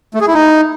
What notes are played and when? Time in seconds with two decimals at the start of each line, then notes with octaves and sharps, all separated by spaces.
0.14 A3
0.21 G#4
0.28 E4
0.34 D#4